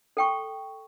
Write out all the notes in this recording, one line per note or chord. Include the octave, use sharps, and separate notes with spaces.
A4 G5 C#6